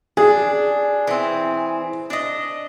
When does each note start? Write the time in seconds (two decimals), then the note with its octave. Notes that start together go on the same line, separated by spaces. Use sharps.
0.17 D4 G#4
1.08 E3 C4
2.10 D4 D#5